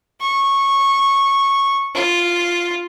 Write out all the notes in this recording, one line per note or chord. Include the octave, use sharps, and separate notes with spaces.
C#6
F4